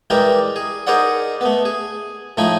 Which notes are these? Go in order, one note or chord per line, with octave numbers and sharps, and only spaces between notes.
E3 G3 G#3 G4 A#4 D5
G#4
D#4 G#4 A#4 C5 D5 F#5
A3 B3
G#4
A2 F3 A3 D#4 G#5 B5